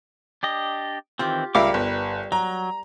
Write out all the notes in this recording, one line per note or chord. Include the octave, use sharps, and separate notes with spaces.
D4 G4 D#5
D#3 E3 C4 F4 G4
C#2 G3 A#4 E5 F5 D6
G1 B4
F#3 A#5